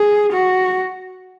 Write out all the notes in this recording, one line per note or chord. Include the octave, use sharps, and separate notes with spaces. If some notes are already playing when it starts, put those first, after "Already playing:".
Already playing: G#4
F#4